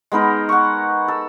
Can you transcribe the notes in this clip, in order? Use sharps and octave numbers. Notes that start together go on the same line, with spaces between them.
G#3 B3 D#4 A#4
F#5 C#6
A4